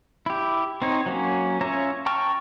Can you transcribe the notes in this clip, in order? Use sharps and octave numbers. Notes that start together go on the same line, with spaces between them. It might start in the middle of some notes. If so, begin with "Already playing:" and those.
E4 G4
C4 D#4 C#5
F#3 A#3 C#4
C#4 F4 C#5 E5 A#5
G5 A5 A#5 C#6 F6